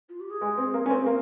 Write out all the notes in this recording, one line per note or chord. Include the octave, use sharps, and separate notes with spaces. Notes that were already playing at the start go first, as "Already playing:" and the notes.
F4
G4
G#4
G#3
C4
A#3
C#4
C4
G#4
A#3 A#4